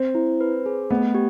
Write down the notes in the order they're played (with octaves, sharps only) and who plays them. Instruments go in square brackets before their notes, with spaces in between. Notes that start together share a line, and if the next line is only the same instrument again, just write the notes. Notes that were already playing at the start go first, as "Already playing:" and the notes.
Already playing: [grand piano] C4
[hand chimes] E4
B4
G#4
[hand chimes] A3 [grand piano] B3
[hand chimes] G4